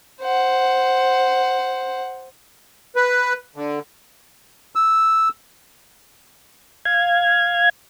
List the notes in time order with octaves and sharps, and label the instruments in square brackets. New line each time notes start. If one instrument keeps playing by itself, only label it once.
[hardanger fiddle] C5 F#5
[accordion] B4
D3
[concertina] E6
[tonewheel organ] F5 G#6